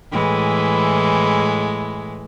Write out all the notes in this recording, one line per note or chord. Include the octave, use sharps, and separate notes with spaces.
A2 E3 G#3